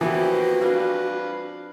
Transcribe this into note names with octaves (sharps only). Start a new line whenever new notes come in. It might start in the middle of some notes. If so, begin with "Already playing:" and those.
D3 E3 F3 A#3 B3 F#4 G4 B4
C4 D4 B4 F5